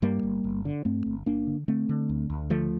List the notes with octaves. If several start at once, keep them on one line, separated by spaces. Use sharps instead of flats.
G2 G3 A#3
G1
G1
D3
G2 A3 C4
G1
G1 A#3 D4
D3
D3 A3 C4
D3
D2
D2
D3 F3 A3